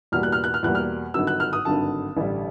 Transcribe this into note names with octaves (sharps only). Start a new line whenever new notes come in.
E2 B2 G3 A#3 F6
F#6
F6
F#6
F6
E2 B2 G3 A#3 F#6
F6
G#1 G2 D3 F#3 E6
F#6
F6
D#6
G#1 G2 D3 F#3 A5
A1 G2 D3 G3